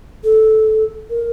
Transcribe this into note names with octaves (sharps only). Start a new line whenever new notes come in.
A4
A#4